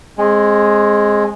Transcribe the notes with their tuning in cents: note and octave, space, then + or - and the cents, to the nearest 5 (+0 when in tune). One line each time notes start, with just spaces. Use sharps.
G#3 +0 C4 +25